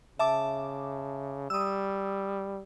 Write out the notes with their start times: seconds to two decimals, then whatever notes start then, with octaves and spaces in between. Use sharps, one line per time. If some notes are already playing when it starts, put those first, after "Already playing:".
0.19 C#3 E5 A5 D6
1.50 G3 D#6 E6